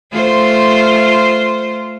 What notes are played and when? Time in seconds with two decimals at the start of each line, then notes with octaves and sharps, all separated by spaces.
0.12 A3 F4 C5